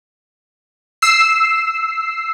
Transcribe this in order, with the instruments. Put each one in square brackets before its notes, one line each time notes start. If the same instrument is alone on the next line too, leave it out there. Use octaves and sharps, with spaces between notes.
[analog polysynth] E6 C7